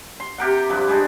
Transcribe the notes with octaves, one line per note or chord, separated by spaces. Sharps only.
C6
C3 G4 A#4 F#5
G2 F3 B4
G3 G#3 D4 D#4